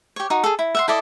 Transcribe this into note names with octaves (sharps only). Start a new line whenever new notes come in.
G4 C#5
D#4 F#4
G#4 A4
E4
E5 F#5 C6
E4 A4 D5 D#5